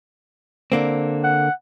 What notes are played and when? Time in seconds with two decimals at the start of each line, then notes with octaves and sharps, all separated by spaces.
0.72 D3 A#3 C4
1.24 F#5